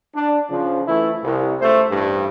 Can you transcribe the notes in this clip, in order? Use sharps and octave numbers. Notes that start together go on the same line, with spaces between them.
D4
C#3 F3
E3 A3 E4
C2
C#2 A3 C5
A1 G2